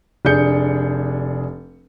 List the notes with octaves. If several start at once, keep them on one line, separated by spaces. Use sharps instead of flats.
F1 D4 G#4 G6 C#7